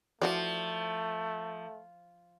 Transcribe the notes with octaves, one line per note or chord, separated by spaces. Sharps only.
E3 F3 A3 F#4 D5